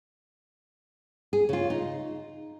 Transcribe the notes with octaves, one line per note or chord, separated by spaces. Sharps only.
G#4
C#3 F4
D#4